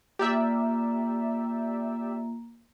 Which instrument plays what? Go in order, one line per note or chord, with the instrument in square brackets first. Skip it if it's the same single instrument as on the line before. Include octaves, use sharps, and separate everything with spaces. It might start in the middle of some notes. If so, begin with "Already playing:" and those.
[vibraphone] A#3 F4 A#5 [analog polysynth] G4 D5 E5